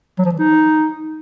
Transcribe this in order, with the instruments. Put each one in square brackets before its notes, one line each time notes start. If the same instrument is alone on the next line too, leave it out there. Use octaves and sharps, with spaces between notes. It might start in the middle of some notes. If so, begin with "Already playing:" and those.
[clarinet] F#3
F3
E3
D#4